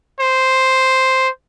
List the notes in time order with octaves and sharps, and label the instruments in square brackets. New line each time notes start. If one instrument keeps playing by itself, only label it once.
[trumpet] C5